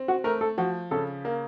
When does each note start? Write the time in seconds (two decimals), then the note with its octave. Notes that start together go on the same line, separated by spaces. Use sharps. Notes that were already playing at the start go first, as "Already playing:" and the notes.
Already playing: C4
0.08 F#4
0.24 A3 A#4
0.41 A4
0.58 F3 F#4
0.91 C#3 A4
1.25 A#3 A#4